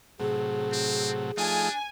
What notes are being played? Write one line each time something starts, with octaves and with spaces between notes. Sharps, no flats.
A2 C3 F#3 G#4
C4
F3 A3 D4 D#4 G#5